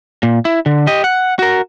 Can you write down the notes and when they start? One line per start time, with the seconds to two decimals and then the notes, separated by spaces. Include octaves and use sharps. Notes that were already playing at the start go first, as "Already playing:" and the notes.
0.23 A#2
0.45 E4
0.66 D3
0.87 G4 D#5
1.04 F#5
1.39 F#4 A#4